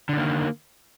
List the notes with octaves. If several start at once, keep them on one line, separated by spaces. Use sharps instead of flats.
D3 D#3 A#3